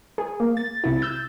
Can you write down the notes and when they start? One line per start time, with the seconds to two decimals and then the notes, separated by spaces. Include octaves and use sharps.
0.18 G#4
0.40 A#3
0.57 A6
0.84 C2 E4
1.02 E6 G6